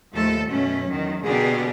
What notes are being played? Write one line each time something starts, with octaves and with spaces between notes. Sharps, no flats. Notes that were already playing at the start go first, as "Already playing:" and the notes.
D#2 A2 F3 A3 A4
F#2 B2 A3 C#4
E2 D#3 F#3
B2 D3 A#3 D4 G4 G#4